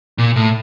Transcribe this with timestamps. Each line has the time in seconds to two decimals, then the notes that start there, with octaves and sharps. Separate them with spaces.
0.18 A#2
0.36 A2